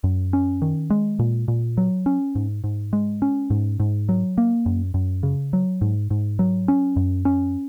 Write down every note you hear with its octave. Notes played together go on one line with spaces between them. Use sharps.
F#2
C#4
D#3
G#3
A#2
A#2
F#3
C#4
G#2
G#2
G#3
C#4
G#2
G#2
F#3
A#3
F#2
F#2
C#3
F#3
G#2
G#2
F#3
C#4
F#2
C#4